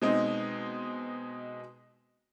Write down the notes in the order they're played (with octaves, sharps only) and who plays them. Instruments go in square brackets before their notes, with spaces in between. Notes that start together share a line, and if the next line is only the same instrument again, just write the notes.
[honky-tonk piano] B2 G#3 C4 D#4